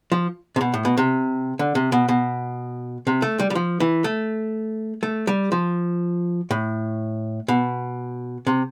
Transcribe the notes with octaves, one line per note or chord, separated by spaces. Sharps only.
F3
C3
B2
A2
B2
C3
D3
C3
B2
B2
C3
A3
G3
G3
F3
E3
A3
A3
G3
F3
A2
B2
C3